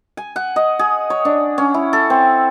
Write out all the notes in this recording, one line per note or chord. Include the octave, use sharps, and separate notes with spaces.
G#5
F#5
D#5
G#4
C#5
D4
C#4
E4
A4
C4